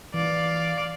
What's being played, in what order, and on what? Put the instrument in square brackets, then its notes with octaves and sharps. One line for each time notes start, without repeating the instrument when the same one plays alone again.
[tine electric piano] E3 [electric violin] D5 F5